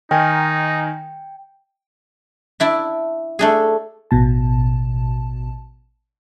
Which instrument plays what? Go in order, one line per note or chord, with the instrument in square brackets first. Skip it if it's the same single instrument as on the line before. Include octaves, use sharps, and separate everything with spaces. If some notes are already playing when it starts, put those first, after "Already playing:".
[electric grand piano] D#3 A#4 G#5 [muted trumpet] D#4 [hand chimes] G5
[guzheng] D4 E4 D5
A3 D4 G#4
[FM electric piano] A1 B2 A5